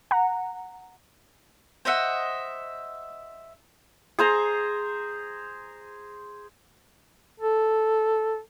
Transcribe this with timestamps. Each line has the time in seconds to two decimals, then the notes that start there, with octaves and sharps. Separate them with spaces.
0.11 F#5 A#5
1.85 C5 D#5 E5 F#5
4.19 G#4 C5 A#5
7.40 A4